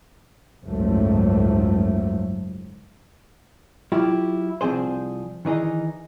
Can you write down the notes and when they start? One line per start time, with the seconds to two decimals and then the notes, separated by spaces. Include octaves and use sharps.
0.65 F#1 C#2 G#2 F3 F#3 A3
3.92 F#3 E4 F4 G4
4.61 C2 F3 C4 G#4 C5
5.45 D#3 E3 D#4 G#4 D#5